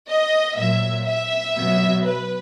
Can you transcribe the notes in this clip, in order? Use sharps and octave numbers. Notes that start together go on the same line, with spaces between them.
D#5
A#2 F#3 E5
E5
B2
F#3
B4